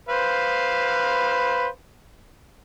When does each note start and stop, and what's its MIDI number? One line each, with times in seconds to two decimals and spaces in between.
0.09 1.66 71
0.09 1.66 72
0.09 1.66 77